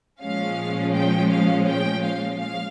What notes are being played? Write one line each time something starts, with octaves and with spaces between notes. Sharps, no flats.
A#2 F3 G#3 C#4 F5
G5
F5
G5
F5
F5